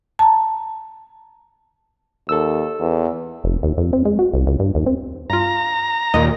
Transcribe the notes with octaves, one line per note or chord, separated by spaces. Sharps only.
A5 A#5
D#2 A4 E6
E2
F1
D#2
F2
C4
G#3
F#4
C2
C#2
G2
D#2
C4
G2 F4 A#5
D#2 A#2 D#5